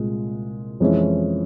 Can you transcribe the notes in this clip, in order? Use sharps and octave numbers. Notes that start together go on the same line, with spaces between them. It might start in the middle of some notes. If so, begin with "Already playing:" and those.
Already playing: C2 A#2 G#3
F2 E3 G#3 C#4 E4